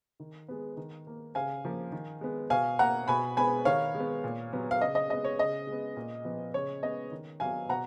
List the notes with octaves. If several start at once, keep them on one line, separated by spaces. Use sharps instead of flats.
D#3
G#3 B3
D#3
A#3
C#3 F5 G#5
F3 A#3
D#3
G#3 B3
B2 F5 G#5
A#3 F#5 A#5
B2 G#5 B5
G#3 B3 G#5 B5
D#3 C#5 F5
G#3 B3
A#2
F#3 B3
F5
C#3 D#5
D#5
G#3 B3 D#5
C#5
C#3 D#5
G#3
B3
A#2
F3 B3
C#3 C#5
G#3 B3 D#5
D#3
F#3 B3 F5 G#5
B2 F#5 A#5